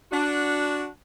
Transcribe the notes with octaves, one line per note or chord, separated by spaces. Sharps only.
D4 F#4